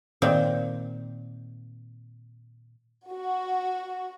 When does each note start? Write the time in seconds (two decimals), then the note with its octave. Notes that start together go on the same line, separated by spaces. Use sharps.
0.22 A#2 D#3 C4
3.09 F#4